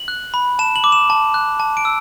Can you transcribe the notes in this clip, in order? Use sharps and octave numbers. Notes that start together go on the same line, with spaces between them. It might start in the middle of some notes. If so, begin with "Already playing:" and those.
Already playing: F#7
F#6
B5
A5 E7
F#7
D6
E7
A5
F#6
A5
D7
E6